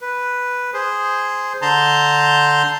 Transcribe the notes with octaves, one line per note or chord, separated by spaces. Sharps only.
B4
G#4 C5
D3 A5 A#5 C6 G6